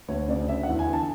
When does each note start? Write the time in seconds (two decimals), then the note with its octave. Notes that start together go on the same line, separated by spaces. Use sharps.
0.08 D2 C#5
0.28 C#3 D5
0.48 D3 E5
0.63 F#5
0.68 E2
0.79 G#5
0.88 D3 A5